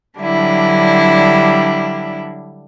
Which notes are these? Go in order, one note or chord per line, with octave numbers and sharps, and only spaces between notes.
D3 F#3 G3 D4 E4